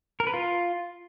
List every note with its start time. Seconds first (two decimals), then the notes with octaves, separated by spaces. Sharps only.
0.20 A#4
0.27 B4
0.34 F4